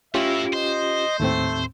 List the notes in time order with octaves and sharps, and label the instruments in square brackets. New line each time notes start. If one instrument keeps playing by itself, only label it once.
[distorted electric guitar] A3 E4 [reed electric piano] C#4 F4 G4 [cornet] E5
[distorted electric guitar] C5 [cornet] D#5
[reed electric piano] D#2 A2 C4 [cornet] A3